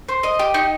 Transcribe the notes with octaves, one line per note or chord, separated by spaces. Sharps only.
C5
D#5
G4
D#4